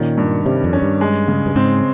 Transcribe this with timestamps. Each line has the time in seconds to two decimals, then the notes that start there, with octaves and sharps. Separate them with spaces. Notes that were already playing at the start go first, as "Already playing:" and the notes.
Already playing: A#2 D#3 C#4
0.18 G2
0.46 C3 G3
0.64 F2
0.73 C#4
0.82 G2
1.01 G#3
1.28 C#3
1.46 G2
1.56 G#2 C4